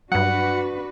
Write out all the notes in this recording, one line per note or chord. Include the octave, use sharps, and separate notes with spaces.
G2 F#3 D4 F#4 B4 F#5